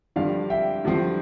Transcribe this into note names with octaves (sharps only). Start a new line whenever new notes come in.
G2 D3 F3 C4 D5 F5
E5 G5
G2 D3 F3 C4